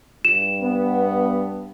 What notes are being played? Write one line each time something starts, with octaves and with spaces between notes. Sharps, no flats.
G2 E7
B3